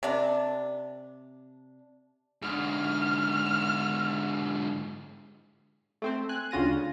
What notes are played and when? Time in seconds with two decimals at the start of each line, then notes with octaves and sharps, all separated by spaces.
0.03 C3 D4
2.42 G#2 D3 F6
6.02 A3 C4 C5
6.29 G#5 F#6
6.51 D2 C#3 F4 A#6 D#7